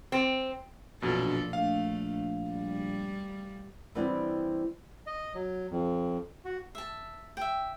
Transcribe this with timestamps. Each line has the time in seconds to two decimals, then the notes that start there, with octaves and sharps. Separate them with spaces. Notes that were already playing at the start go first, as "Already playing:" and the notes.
0.12 C4
1.02 A#1 F#2 B2 D4 F4 A4
1.53 A3 F5
2.50 G3
3.95 E3 G3 B3 C4 D4 E4
5.07 D#5
5.34 F#3
5.71 F2
6.45 F#4
6.75 E5 A5
7.37 E5 G5